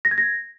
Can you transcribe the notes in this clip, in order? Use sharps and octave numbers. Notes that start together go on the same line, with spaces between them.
A#6
G#6
A#6